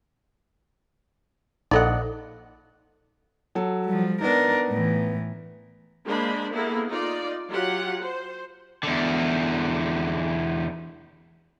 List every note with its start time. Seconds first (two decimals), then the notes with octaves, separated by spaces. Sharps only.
1.71 A#1 D#4 A4 D5 D#5 F#5
3.55 F#3 A4
3.85 F3 G3
4.21 B3 D4 D#4 A#4
4.69 A2 E3
6.05 G#3 A#3 D4 C5 B5
6.52 A#3 B3 E4 G#4 A4
6.88 D#4 F4 D5
7.50 F#3 F4 G4 F#5
8.02 C5
8.83 E2 D3